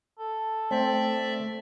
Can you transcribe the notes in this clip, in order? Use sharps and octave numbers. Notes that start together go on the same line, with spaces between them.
A4
A3 C4 D5 E5